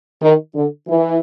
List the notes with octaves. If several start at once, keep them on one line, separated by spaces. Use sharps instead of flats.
D#3
D3
E3